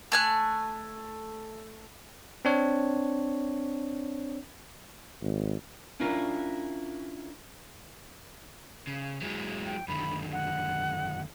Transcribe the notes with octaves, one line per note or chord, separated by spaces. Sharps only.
A3 G#5 F#6
C4 D4 C#5
G#1
C#4 D4 E4 F4 A#4
C#3
F#3 G#3 E4
G5
F#2 D3 D#3 B5
F#5